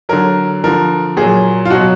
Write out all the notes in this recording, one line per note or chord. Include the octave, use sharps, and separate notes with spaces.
D3 F#3 A#4
D3 F3 A#4
A#2 F#3 G#4
F4
B2 F#3 F#4